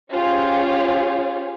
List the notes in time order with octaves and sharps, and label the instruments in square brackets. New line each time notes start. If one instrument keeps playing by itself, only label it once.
[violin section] C#4 F4 G4 G#4 C5 C#5